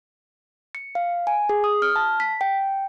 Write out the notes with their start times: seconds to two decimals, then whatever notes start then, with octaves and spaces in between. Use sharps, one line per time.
0.75 C#7
0.95 F5
1.27 G#5
1.49 G#4
1.64 D#6
1.82 F6
1.96 A5
2.20 B6
2.41 G5